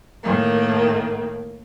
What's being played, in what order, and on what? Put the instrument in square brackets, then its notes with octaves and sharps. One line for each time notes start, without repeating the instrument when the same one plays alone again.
[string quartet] A2 D#3 A#3